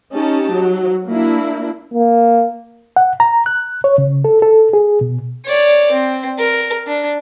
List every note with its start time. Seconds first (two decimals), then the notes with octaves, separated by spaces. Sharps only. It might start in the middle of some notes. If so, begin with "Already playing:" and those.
0.13 C#4 D#4 G4 A5
0.52 F#3
1.07 A#3 D4 E4
1.94 A#3
2.96 F#5
3.20 A#5
3.46 F#6
3.84 C#5
3.98 C#3
4.25 A4
4.42 A4
4.73 G#4
5.01 B2
5.46 C#5 D5
5.92 C4
6.39 A#4
6.87 D4